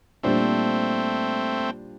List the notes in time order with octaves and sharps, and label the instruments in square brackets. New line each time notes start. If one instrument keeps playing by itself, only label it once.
[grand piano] A#2 G3 D4 F4 C5 [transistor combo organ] A3 C4